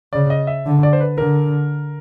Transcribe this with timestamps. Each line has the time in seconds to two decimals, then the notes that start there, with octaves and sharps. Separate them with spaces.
0.13 C#3 D5
0.30 D#5
0.47 E5
0.66 D3
0.83 D5
0.93 C5
1.00 B4
1.18 D3 A#4